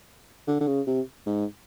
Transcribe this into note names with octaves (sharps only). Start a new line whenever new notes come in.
D3
D3
C#3
C3
G#2